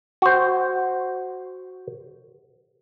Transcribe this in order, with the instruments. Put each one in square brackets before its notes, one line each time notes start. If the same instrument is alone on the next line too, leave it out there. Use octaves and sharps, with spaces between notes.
[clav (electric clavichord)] F#4 C5